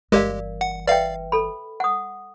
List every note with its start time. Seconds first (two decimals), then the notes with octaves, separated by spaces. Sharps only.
0.12 G1 E3 G#3 G4 A#4 D5 F5
0.61 F#5
0.87 B4 D5 E5 F5 G5
1.32 A4 B5
1.80 F#5 D#6